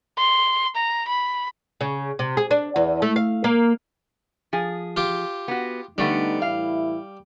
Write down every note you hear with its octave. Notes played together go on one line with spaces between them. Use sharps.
C6
A#5
B5
C#3
C3
G#4
D4
E2
A3
F5
A#3
F3 G#4
F4 G4
B3 F#4
D3 G3 A3 B3 D#4
A2 E3 E4 F5